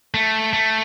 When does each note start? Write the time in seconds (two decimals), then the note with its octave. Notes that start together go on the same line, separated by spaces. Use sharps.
0.14 A3
0.53 A3